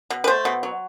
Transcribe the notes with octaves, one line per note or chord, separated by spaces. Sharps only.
B2
B4
A3 C5
B2
F#3